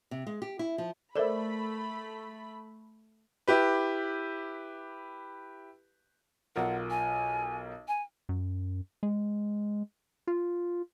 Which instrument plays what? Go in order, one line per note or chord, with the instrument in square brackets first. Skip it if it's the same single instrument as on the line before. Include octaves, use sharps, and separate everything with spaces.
[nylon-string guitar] C3
G#3
G4
E4
F3
[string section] A3 B5 [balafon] A4 A#4 C5 [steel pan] D5 E5
[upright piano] E4 G4 B4
[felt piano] B1 F4 A#4 [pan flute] F#5
[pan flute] G#5
G#5
[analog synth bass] F#2
G#3
F4